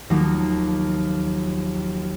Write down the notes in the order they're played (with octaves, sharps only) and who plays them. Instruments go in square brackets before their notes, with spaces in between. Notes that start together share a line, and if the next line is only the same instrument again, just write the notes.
[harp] D#2 F3 F#3 A3 A#3